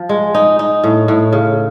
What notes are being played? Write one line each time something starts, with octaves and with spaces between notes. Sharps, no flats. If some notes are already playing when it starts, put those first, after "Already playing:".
Already playing: F3
G#3
D#4
D#4
A2
A2
C#3